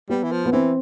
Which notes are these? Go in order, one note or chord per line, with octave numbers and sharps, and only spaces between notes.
G3 B3
E3
F3
B3
E3 C4